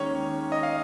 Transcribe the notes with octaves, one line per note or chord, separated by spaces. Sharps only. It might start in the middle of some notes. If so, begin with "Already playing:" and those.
Already playing: D#2 D#3 G#3 C#4 C#5
D#5
F5